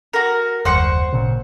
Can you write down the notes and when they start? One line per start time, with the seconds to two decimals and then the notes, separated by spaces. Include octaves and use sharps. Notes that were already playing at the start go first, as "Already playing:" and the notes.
0.13 F#4 A#4
0.65 F#1 D#2 G3 C5 F#5 C#6
1.13 G#1 A#2 C#3